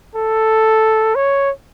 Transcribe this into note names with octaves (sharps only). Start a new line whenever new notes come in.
A4
C#5